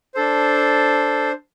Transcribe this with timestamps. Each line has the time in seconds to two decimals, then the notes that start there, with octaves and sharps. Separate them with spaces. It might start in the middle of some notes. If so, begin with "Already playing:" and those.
0.15 D4 A4 C5